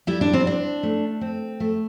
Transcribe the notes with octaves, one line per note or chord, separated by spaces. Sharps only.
G3 E4
D4
C4
C4 D4
A3
C4
A3